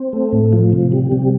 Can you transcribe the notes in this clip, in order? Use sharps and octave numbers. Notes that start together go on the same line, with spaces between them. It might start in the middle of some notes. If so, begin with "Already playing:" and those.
Already playing: C4
A3
A2
F3
C3
G3
C3